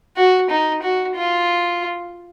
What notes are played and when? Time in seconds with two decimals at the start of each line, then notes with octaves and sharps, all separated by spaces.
0.17 F#4
0.50 D#4
0.83 F#4
1.16 F4